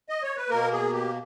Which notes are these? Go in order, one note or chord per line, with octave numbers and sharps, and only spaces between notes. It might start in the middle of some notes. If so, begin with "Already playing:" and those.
D#5
C#5
B4
B2 A#3 A#4
G#4
G4